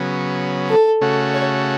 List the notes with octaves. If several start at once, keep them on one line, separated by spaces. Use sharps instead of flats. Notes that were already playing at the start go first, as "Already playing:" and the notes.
Already playing: C#3 F#3 B3
A4
C#3 A3 F#4
C#5